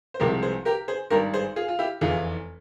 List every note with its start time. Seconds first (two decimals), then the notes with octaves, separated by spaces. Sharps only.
0.14 C5
0.20 C2 C3 F3 G#3 G4 A#4
0.43 G#4 C5
0.65 G4 A#4
0.88 G#4 C5
1.10 G#1 G2 G3 G4 A#4
1.33 G#4 C5
1.56 F4 G#4
1.68 F4
1.79 E4 G4
2.01 F1 E2 E3 F4 G#4